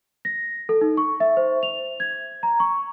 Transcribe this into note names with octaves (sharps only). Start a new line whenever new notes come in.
A#6
A4
D#4
C#6
E5
C5
F7
G#6
A#5
C#6